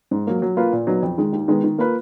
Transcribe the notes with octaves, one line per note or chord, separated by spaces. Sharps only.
G#2
F#3 A#3
F#3
A#3 F4 B4
A#2
F#3 B3 D#4
F2
D#3 G#3
D#2
D#3 G#3 B3
D#3
A#3 F4 B4